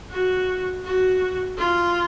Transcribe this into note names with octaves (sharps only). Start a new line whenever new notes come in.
F#4
F#4
F4